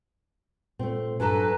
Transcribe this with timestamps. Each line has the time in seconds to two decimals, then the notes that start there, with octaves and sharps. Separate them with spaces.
0.79 A#2 A3 C4
1.20 G2 F#3 D4 A4 B4 G#5 A#5